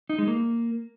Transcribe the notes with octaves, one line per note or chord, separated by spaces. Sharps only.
D#4
G#3
A#3